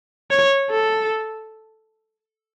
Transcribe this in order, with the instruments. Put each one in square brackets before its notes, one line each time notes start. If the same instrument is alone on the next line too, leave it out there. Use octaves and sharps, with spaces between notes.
[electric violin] C#5
A4